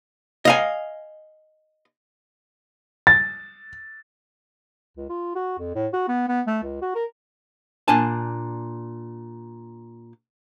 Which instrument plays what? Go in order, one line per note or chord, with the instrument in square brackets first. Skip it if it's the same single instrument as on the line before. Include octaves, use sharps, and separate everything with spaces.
[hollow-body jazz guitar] D#5 F5 G#5
[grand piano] A6
[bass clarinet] C#2
F4
F#4
F2
A2
F#4
B3
B3
A3
C#2
F#4
A#4
[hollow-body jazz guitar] A#2 D4 G#5 A5